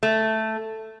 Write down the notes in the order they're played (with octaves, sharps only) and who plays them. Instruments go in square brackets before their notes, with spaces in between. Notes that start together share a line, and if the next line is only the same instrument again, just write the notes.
[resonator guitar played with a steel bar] A3